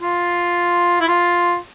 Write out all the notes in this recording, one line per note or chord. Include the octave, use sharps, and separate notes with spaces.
F4
E4
F4